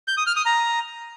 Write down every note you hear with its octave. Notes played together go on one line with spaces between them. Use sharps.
G6
D#6
F6
D#6
A#5